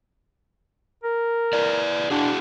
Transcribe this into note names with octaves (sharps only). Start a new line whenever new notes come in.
A#4
E4 B4 D5
D4 E4 F#4 G#4